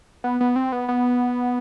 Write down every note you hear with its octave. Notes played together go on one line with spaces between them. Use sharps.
B3
B3
C4
B3
B3